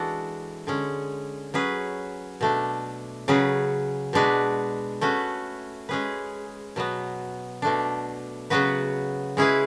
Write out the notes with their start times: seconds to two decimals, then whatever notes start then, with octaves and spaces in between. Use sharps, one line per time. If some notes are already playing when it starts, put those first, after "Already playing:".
Already playing: E3 G#3 D4 F#4 A4
0.67 D3 G#3 C#4
1.54 F#3 C#4 G#4 B4
2.41 B2 A3 D4
3.28 C#3 F#3 C#4 G#4 B4
4.13 B2 G#3 D4 F#4 B4
5.01 A3 C#4 F#4 B4
5.89 G#3 C#4 G#4 B4
6.76 B2 F#3 B3
7.62 B2 A3 D4
8.50 C#3 F#3 B3 F#4 B4
9.37 G#3 C#4 E4 G#4 B4